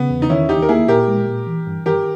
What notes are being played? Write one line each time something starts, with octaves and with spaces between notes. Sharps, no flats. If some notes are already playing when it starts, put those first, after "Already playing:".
Already playing: C#3 B3
E2
D#4
D#3 C#4 E4
D#2 D#4 G4
A#4
A#3 E4 G#4
A#2 G4 A#4
G#3
A#2
E3
G2
D#3 G4 A#4